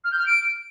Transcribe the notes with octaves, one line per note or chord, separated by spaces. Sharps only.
F6
G6
F6
D7